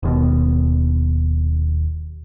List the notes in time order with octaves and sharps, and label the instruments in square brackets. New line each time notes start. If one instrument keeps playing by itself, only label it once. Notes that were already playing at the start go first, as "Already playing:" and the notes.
[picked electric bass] D#1 D#2 B2